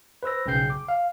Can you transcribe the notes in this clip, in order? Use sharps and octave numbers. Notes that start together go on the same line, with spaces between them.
B4 C5 E6 A#6
B1 C#3 G#4 G5 G6 C7
D6
F5